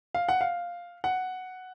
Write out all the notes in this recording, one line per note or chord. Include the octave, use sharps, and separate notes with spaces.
F5
F#5
F5
F#5